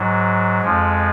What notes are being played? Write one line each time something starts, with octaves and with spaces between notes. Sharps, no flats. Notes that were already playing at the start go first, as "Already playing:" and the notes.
Already playing: G#2 F#3
F2 F3 G#3